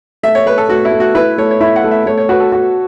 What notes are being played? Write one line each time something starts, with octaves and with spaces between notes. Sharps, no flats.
A3 E5
C#5
A3 B4
A4
A3 F#4
E4
A3
F#4
E4 B4
A3 C#5
C#5
E4 E5
F#5
A3
E5
A3 C#5
C#5
F#4 B4
A4
F#4